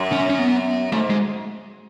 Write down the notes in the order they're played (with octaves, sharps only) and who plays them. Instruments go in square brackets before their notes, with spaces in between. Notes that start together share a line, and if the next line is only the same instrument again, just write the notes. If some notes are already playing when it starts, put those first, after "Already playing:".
Already playing: [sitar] F#2
[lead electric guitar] C#4
C#4
B3
[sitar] G#2 [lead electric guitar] A3
[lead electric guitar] G#3